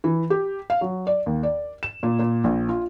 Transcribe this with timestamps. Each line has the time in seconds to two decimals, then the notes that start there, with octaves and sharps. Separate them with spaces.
0.04 E3
0.30 G4
0.70 F5
0.81 F#3
1.07 D5
1.26 D#2
1.43 D5
1.83 E7
2.03 A#2
2.19 A#2
2.44 A#1
2.69 F4